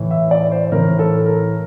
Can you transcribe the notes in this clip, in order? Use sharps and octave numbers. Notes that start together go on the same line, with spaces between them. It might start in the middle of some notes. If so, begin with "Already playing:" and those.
Already playing: A2 E3
E5
D5
C5
A2 E3 A#4
A4
A#4